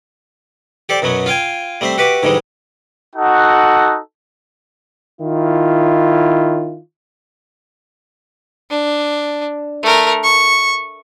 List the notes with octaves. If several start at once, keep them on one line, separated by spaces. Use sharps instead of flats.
G4 A4 C5 D5
F#2 B2 F#3 B3
F4 F5 G5 G#5
G3 A3 C4 C5 E5
F#4 G4 B4 E5 D6
G#2 D3 E3 G3 G#3
D#4 F#4 A4 F#5
D#3 E4 F4
D4
A3 A#4
C#6